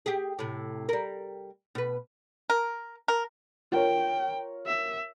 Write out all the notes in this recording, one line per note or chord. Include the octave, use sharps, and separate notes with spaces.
G4 G#4
A2 C3
G3 A#4
B2 B4
A#4
A#4
F4 A#4 C#5 G5
E5